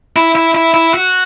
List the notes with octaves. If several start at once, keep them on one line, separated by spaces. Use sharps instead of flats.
E4
E4
E4
E4
F#4